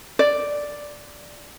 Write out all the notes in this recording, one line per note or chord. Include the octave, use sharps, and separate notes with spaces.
D5